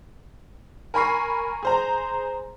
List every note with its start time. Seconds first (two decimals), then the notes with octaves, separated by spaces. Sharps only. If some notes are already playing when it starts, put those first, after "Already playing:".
0.94 A#4 G#5 B5 C#6 C7
1.63 G#4 C5 A#5